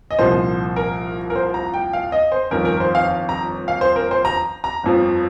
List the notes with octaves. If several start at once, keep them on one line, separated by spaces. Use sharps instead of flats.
D#5
C2 A#2 F3 C5
A#4
A#4
C5
A#5
G5
F5
D#5
C5
G1 F2 D#3 A#4
A#4
C5
F5
A#5
F5
C5
A#4
C5
A#5
A#5
G1 F2 F3